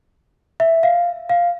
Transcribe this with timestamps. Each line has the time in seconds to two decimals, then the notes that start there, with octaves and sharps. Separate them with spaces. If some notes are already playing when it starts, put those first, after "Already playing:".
0.60 E5
0.83 F5
1.29 F5